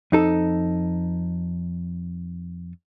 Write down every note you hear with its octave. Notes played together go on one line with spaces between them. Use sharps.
F2 D#4 A4